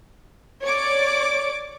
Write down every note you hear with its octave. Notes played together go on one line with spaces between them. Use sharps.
C#5 D5 D6